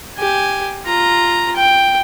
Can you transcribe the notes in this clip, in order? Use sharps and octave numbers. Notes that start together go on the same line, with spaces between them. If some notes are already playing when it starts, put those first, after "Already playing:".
G4 G#5
F4 A#5
G5